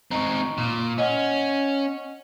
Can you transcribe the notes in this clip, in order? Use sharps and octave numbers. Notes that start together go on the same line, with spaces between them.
C4 D#4 A#5 C#6
A#2
C#4 D#5 F#5 F6